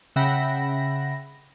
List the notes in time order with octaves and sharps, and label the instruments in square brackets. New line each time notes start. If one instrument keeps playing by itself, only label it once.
[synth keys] C#3 E5 F#5 G5 B5 A#6